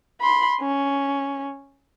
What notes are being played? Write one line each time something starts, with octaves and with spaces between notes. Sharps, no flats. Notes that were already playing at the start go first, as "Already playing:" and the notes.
B5 C6
C#4